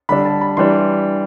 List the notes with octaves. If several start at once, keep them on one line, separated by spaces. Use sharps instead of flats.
D3 G3 D4 B5
A5
B5
E3 G3 D4 C6